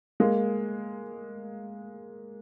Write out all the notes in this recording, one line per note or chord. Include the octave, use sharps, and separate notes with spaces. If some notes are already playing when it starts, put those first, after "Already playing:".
G#3 A#3